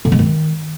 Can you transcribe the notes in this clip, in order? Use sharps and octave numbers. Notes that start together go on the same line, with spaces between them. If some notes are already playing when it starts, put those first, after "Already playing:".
D3
G#3
D#3